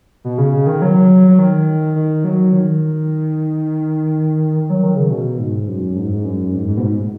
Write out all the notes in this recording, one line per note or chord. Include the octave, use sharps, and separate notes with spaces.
B2
C#3
C#3
D#3
F#3
F#3
D#3
D#3
F#3
D#3
F#3
D#3
C#3
B2
G#2
F#2
G#2
G#2
F#2
G#2
G#2
B2
G#2